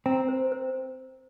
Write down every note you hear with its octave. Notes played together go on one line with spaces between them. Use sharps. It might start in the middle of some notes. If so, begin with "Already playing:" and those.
C4 A#5
C5
C5